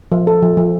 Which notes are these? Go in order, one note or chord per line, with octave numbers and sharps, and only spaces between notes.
F3
A4
F3
F3